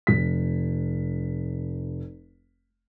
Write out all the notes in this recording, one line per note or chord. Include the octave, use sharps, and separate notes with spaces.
F1 B6